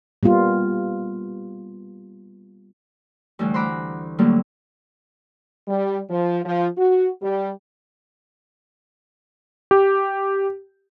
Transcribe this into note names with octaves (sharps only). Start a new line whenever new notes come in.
G3 A#3 B3 F4
D2 A2 E3 G3
C5 F#5 A#5 B5 D6
A2 D3 F#3 G3 A3 A#3
G3
F3
F3
F#4
G3
G4